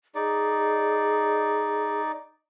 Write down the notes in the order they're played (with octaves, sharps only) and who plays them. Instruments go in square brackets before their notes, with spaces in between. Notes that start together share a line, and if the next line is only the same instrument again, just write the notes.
[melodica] D#4 D5 [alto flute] G#4